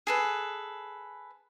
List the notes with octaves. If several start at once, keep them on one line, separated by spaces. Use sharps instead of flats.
G#4 A4 B4